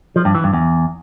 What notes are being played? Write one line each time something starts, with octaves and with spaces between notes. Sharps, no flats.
F3
G2
E3
G2
E2